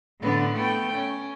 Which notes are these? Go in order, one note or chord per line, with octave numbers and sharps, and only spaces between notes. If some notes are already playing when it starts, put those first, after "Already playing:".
A2 D3 B3
A3 B3 G5
C#4